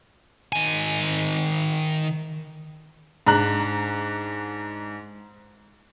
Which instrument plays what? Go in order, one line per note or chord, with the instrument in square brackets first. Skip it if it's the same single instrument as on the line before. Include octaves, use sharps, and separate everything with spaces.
[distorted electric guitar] D#3 G#5
[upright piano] G#2 D4 A#5 F#6 F#7